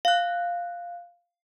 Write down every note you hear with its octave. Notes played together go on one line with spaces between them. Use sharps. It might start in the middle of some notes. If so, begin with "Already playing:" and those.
F5 F#6